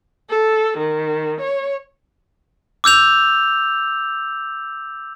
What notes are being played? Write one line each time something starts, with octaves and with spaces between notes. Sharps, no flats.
A4
D#3
C#5
D6 E6 G6 F7